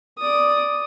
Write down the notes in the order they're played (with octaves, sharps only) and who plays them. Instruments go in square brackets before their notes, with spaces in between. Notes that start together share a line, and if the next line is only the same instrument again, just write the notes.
[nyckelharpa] D5 D#6